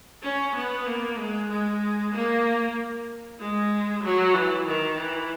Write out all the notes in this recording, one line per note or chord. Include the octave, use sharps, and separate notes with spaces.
C#4
B3
A#3
G#3
G#3
A#3
G#3
F#3
E3
D#3
E3